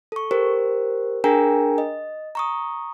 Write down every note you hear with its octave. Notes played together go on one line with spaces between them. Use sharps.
A4 C#6
G4 A#4 C5
D4 G#4 A#4 G5 G#5 A#5
D#5
A#5 C#6 D#6